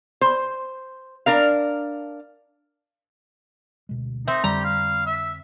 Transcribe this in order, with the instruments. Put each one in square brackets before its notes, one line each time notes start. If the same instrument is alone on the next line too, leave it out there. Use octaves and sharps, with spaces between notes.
[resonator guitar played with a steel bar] C5
D4 A#4 F5
[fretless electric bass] D2 B2 G#3
[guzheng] C4 [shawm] D#4 [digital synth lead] E5
[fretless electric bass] F2 D3 [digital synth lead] G3 [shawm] G4 [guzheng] A#5
[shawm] F5
E5